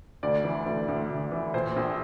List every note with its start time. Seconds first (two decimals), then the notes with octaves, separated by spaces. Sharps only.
0.23 D2 D5
0.44 E3
0.66 D2
0.88 D2
1.10 D2
1.32 E3
1.54 A#2 C5
1.76 A#1